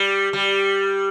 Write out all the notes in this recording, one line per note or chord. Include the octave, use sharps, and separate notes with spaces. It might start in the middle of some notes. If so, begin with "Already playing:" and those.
Already playing: G3
G3